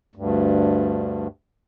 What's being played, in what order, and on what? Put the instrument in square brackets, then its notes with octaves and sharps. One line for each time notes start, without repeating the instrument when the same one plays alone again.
[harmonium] D2 G2